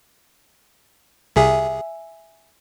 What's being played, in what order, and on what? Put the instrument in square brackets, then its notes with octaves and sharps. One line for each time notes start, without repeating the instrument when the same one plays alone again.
[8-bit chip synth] C2 C3 G#4 [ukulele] E5 G#5